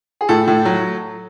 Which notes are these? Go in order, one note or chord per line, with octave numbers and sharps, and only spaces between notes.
G#4
A2 A4
A2
F#3